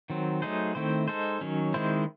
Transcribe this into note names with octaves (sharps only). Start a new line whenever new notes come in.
D#3 F#3 C4
F#3 A3 D#4 G#4 C5
D#3 A3 C4 E4 C5
G#3 D#4 A4 C5
D#3 F#3 C#4
D#3 G#3 C4 E4 C5